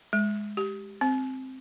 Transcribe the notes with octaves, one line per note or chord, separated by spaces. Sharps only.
G#3
G4
C4